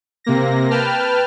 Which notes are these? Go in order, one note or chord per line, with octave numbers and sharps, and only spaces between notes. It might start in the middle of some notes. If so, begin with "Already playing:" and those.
C3 A#3 A#6
B4 G5 A5 F6